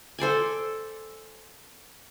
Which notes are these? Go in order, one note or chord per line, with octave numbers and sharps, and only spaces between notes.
A4 C5 D5 G#5